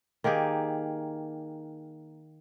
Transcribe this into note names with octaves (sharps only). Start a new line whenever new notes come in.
D#3 A#3 G4 G#4